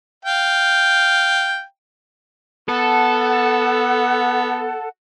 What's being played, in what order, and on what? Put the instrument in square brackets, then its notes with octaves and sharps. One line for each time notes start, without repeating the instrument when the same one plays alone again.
[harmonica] F5 G5
[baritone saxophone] B3 [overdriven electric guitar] A4 [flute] F#5